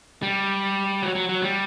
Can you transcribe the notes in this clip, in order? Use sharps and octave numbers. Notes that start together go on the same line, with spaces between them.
G3
F#3
F#3
F#3
G3